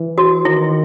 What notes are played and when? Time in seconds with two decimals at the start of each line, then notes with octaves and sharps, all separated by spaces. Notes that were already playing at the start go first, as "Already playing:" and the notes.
Already playing: E3
0.18 F#4
0.45 D#3 E4